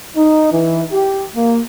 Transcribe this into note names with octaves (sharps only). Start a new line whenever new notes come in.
D#4
E3
G4
A#3